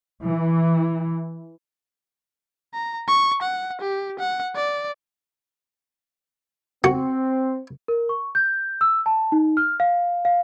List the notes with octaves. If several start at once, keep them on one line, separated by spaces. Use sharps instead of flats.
E3
A#5
C#6
F#5
G4
F#5
D5
C4 F#4
A#4
C#6
G6
E6
A5
D#4
F6
F5
F5